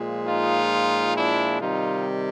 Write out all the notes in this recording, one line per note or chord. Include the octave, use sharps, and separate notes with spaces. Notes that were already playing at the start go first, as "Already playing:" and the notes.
Already playing: A#2 F3 G#3
D#4 F4
D4 E4
C3 D#3 G3 D#4 F4